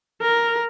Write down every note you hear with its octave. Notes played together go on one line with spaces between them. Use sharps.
A#4